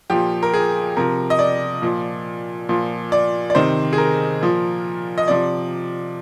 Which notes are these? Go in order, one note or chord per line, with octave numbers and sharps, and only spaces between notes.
A#2 F3 G4
A#4
G#4
C3 F3 A#4
D#5
D5
A#2 F3
A#2 F3
D5
D5
C3 D#3 C5
G#4
A#4
A#2 F3
D#5
C3 F3 D5